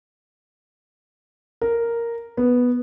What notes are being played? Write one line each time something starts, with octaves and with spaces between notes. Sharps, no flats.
A#4
B3